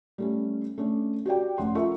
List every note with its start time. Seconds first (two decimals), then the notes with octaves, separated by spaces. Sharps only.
0.18 G3 A3 C#4
0.78 A3 C#4 D4
1.26 F#4 G4 D5 G5
1.58 F1 C#4 F#5 C6
1.75 F4 A4 A#4 E5 C#6